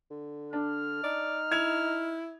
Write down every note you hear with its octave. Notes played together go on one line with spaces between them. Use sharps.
D3
D4 F6
D#4 D5
E4 G#6 F7